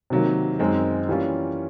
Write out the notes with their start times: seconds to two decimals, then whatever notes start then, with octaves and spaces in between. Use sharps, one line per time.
0.10 C3 D#3 F#3 A#3
0.59 F#2 D#3 G#3 C4
1.08 E3 G3 A#3 C#4 F4